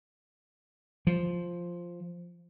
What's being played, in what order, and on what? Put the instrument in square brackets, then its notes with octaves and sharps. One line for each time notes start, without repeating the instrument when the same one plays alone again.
[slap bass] F3